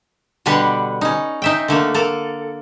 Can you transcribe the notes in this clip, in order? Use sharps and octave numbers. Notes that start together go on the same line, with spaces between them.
B2 D3 G3 D4 B4 F#5
C#4 D#4
D#4 E5 G5
D3 A3 A#3
A#3 A4